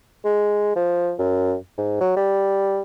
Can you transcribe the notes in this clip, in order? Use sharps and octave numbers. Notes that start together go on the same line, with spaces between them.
G#3
F3
F#2
G#2
F#3
G3